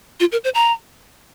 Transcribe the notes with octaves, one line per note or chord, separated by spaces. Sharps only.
F4
A#4
C5
A#5